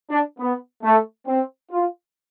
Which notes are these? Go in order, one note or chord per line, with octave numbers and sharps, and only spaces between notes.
D4
B3
A3
C4
F4